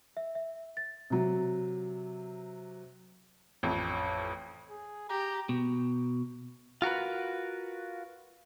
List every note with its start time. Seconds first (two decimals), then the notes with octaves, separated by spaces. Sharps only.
0.17 E5
0.35 E5
0.77 A6
1.10 C3 F#3
3.63 A1 F2
4.70 G#4
5.09 G4 A#5
5.49 B2
6.82 F4 F#4 A#4 B4